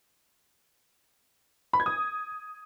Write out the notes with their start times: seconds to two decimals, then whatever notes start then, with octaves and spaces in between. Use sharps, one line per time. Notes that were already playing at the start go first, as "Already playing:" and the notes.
1.73 B5
1.80 G#6
1.86 D#6